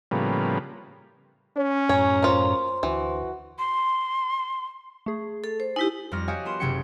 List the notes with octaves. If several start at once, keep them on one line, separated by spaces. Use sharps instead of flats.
A2 C#3 F3 G3 A#3 B3
C#4 C#5
F#2 A2 C#5 G#5 A#5
A#3 F4 C5 C6
D2 E3 F#4
C6
A3 G#4
A4
C5
D#4 E4 G4 G#5 B6
F2 G3 C4 C#6 F6 A#6
F#4 G4 C#5 D#5 F5 G#5
B3 F4 A#4 C6 E7
F#1 C3 F#3 C#4 G5 C#7